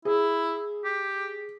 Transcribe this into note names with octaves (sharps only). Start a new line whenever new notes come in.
E4 G#4
G4